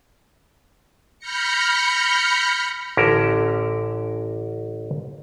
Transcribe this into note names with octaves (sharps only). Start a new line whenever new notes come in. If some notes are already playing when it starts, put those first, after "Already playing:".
B5 F6 G6 A#6 C#7
A1 D3 C#4 A#4 E5